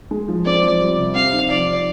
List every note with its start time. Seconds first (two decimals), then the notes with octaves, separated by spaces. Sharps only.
0.11 G#3
0.28 F3
0.45 C4 D5
0.63 F3
0.80 G3
0.98 C3
1.15 C4 F5
1.33 D#4
1.50 F3 D5